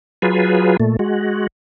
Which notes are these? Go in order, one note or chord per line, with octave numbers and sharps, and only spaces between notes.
F#3 F4 G#4 B4
A#2 A3
G#3 F#4